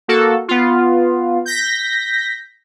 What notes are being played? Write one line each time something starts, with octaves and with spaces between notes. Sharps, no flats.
A#3 F#4 A4
B3 F4
G6 A#6 B6